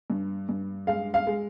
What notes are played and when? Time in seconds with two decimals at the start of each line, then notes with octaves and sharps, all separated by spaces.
0.10 G2
0.49 G2
0.87 G#3 F5
1.14 F5
1.27 G#3